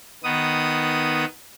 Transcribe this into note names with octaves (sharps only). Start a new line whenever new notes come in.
D#3 B3 D#6